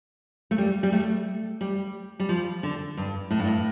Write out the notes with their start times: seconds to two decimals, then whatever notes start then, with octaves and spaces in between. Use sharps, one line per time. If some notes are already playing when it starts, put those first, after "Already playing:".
0.51 A3
0.58 G3
0.83 G3
0.92 A3
1.61 G3
2.19 G3
2.29 F3
2.63 D3
2.97 G2
3.30 A2
3.39 G2
3.47 A2